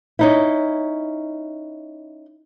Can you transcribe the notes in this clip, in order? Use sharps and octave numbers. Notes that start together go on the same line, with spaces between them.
C#4 D#4 E4